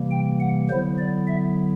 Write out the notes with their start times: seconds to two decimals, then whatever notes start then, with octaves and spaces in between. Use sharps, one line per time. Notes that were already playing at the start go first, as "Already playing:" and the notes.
Already playing: C3 E3 G3 A#3
0.11 G5
0.40 F#5
0.69 D3 F#3 B3 E4 C5
0.98 D5
1.27 E5